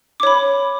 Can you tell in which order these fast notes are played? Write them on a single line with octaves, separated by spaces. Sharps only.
D6 C#5 B5